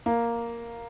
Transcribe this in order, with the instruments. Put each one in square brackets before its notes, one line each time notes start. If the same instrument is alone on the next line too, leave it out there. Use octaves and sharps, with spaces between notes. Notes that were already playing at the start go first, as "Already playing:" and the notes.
[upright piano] A#3